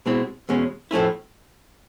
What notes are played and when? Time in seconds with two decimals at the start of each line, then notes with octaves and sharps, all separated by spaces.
0.06 B2 G#3 C4 E4
0.49 E2 B2 G#3 C#4
0.91 A2 F3 A3 C#4 E4